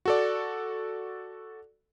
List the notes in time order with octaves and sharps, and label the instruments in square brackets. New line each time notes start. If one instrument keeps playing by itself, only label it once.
[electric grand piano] F#4 A4 D5